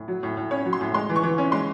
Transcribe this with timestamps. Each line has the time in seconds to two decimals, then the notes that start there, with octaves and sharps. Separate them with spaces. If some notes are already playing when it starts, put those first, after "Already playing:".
Already playing: A2
0.08 F#3
0.23 A2
0.37 A2
0.51 C#4 C#5
0.66 F#3
0.73 C6
0.81 A2
0.94 G#3 C6
1.10 E3
1.16 C#6
1.23 E3
1.38 C#4
1.52 G#3 C6